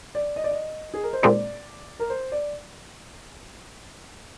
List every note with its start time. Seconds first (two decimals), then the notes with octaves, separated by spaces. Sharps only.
0.15 D5
0.36 D#5
0.44 D5
0.51 D#5
0.94 G#4
1.03 A#4
1.13 C5
1.22 A#2 G#3 C4 D#4 D5
1.99 A#4
2.10 C5
2.32 D5